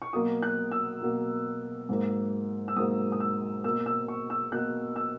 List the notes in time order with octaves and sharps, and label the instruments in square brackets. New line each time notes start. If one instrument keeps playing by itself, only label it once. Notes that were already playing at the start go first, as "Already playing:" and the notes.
[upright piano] C#6
B2 F#3 A#3 D#6
F#6
E6
B2 F#3 A#3
G#2 F#3 A#3
E6
G#2 F#3 A#3 D#6
D#6
E6
B2 A#3 E6
E6
C#6
E6
B2 A#3 F#6
E6